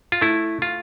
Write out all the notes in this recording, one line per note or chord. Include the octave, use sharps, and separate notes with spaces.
F4
A3 E4
F4